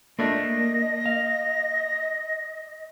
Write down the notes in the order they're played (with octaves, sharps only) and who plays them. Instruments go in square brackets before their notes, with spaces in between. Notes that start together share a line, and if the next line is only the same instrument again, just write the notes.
[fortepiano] A3 D4 [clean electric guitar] A#3 [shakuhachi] D#5 [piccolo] A#6
[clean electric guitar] F5